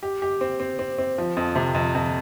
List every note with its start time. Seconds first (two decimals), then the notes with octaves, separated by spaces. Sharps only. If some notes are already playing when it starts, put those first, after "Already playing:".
0.03 G4
0.22 G4
0.41 C4
0.60 C4
0.79 C4
0.98 C4
1.18 F3
1.37 F2
1.55 C3
1.75 F2
1.95 F2